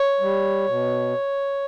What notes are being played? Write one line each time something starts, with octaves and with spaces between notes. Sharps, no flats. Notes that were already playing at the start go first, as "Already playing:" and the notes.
Already playing: C#5
G3
B2